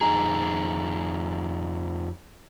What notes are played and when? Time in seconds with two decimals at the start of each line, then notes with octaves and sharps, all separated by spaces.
0.01 F2 D#4 G#4 A#5